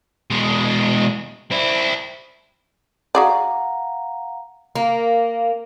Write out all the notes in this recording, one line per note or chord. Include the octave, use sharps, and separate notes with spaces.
B2 G#3
C4 E4
F#4 G#4 D5 F5 F#5 A#5
A#3